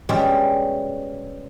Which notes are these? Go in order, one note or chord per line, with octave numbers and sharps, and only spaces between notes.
B2 G3 G#3 C#4 D5